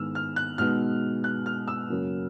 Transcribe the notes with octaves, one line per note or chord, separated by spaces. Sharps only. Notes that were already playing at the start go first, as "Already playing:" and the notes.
Already playing: G#2 D#3 G#3 B3 E4 E6 F6
F6
F#6
B2 G#3 B3 D#4 F6
F#6
F6
E6
F#2 C#3 F#3 A#3 C#4